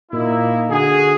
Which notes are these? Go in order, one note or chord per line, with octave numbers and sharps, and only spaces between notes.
A#2 A#3 D#4 E4
D3 F#4 G#4